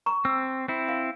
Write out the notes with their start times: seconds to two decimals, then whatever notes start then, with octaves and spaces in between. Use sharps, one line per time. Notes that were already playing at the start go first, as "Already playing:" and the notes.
0.06 A#5 C#6
0.25 C4 E6
0.68 C4 E4
0.89 F5